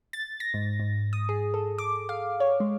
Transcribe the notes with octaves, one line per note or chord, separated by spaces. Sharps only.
A6
A#6
G#2
G#2
D#6
G#4
A4
D6
F5
C#5
G#3